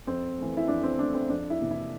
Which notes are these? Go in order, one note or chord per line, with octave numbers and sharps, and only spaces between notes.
F2 C4
E3 A3
E4
F2 D4
C4
E3 A3 D4
C4
F2 D4
E4
C3 E3 A#3
E4